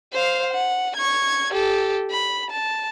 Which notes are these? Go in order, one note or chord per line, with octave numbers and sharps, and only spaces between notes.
C5 F5
F#5
C#6 G#6
G4 A4
B5
A5